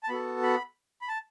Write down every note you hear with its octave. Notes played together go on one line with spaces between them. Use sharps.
A5
B3 F#4 A4 B5
B5
B5
A5